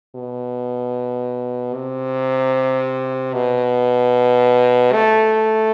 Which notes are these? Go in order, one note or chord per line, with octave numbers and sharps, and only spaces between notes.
B2
C3
B2
A3